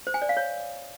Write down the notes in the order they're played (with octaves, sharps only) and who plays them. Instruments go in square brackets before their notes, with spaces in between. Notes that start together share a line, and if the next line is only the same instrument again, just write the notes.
[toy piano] C5
G#5
D5
F5
C#5